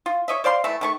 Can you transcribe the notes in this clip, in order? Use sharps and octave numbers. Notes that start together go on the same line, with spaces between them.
F4
C#5 D#5 E5
C5 D5 F5 C6
E3 A3 E5
D#3 A3 C#6